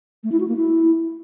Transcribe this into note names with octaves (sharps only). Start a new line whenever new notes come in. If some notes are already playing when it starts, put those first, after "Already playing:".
A3
E4
F#4
A#3
E4